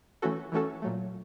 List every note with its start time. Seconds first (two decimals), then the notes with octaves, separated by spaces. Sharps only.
0.22 E3 A3 C#4 F#4 A4
0.52 E3 A3 C#4 F#4 A4
0.82 A#2 F#3 A3